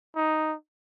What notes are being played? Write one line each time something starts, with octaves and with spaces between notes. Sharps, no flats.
D#4